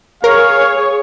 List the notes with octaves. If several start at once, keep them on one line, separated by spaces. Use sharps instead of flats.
G#4 A#4 C#5 F5